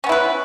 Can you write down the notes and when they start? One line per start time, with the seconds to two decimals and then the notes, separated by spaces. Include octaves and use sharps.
0.04 C#4
0.06 B3
0.09 E4
0.12 B4